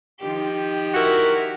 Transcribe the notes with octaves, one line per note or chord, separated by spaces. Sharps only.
D#3 F3 G4
E4 F#4 A#4